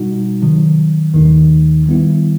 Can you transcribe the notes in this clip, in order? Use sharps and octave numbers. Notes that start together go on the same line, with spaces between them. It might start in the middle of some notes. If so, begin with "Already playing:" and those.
Already playing: B2 G3 D#4 F#4
C3 D#3 F#3
D#2 D#3 A3 D#4
D#3 G3 B3 E4